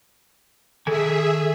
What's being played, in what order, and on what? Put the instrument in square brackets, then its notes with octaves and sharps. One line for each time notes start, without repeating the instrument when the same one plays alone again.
[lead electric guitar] D#3 G#5 [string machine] G#4 E5 [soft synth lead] A4